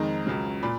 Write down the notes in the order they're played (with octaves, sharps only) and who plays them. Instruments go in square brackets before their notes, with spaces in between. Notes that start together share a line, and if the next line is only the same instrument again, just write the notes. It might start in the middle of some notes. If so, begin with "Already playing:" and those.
Already playing: [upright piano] F2 D#3 G#3 D#4 A#5
C#2 C#3 F#3
A#2 B5